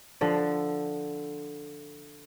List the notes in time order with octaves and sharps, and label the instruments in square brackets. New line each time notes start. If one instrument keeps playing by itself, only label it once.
[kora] D3 F3